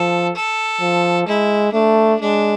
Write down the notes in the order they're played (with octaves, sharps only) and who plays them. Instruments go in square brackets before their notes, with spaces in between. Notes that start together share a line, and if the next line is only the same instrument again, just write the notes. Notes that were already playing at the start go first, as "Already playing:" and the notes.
Already playing: [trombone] F3 [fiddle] A4
[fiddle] A4
[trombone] F3
[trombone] G#3 [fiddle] E4
[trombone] A3 [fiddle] D4
[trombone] G#3 [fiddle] D4